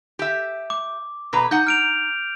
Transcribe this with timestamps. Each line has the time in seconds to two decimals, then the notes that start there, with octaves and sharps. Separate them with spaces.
0.19 G4 E5
0.70 D6
1.33 B2 B4 A#5
1.51 D#4 F#5 G6
1.67 F6 D7 F7